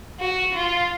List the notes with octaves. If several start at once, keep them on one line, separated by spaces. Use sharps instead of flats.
F#4
F4